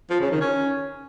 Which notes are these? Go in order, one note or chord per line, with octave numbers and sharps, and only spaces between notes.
F3
C#3
D#3
C#4